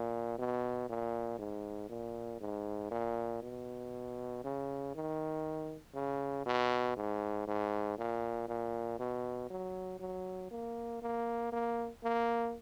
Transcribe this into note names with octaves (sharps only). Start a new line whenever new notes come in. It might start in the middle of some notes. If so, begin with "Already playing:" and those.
Already playing: A#2
B2
A#2
G#2
A#2
G#2
A#2
B2
C#3
D#3
C#3
B2
G#2
G#2
A#2
A#2
B2
F#3
F#3
A#3
A#3
A#3
A#3